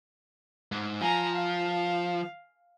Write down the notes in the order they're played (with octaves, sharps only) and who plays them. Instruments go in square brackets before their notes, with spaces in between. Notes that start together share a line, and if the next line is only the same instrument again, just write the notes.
[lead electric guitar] G#2
[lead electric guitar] F3 [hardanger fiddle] G#5 A#5
[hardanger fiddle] F5